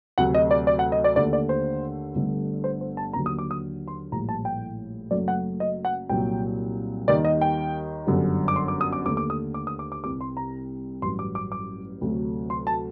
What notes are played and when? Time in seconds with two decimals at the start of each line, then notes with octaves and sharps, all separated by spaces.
0.18 D2 C3 F#3 A3 F#5
0.35 D#5
0.51 D5
0.67 D5
0.79 F#5
0.92 D#5
1.04 D5
1.16 D#2 D3 A3 D5
1.33 D5
1.49 C5
2.15 G1 G2 D3 A3
2.64 C5
2.81 C5
2.97 A5
3.13 D#2 D3 F#3 A#5
3.26 D#6
3.39 D6
3.51 D#6
3.88 C6
4.12 A#1 A2 G3 A#5
4.29 A5
4.45 G5
5.11 F#1 F#2 F#3 A3 D5
5.28 F#5
5.60 D#5
5.85 F#5
6.09 C2 A#2 F#3 G5
7.08 D#2 D#3 G3 D5
7.25 D#5
7.41 G5
8.07 G1 F#2 D3 G3
8.48 D6
8.56 C6
8.68 D6
8.81 D#6
8.93 D6
9.05 D#2 D3 A3 D6
9.17 D6
9.30 D#6
9.54 D6
9.67 D#6
9.79 D6
9.92 D6
10.04 C2 C3 G3 D6
10.21 C6
10.37 A#5
11.02 A1 G2 F#3 C6
11.19 D6
11.35 D6
11.52 D6
12.01 D2 C3 F#3 A3
12.50 C6
12.67 A5